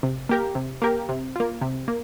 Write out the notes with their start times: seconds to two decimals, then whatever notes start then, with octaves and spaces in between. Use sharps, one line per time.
0.03 C3
0.29 A#3 G4 A#4
0.55 C3
0.82 A#3 G4 A#4
1.09 C3
1.36 A#3 F4
1.61 C3
1.88 A#3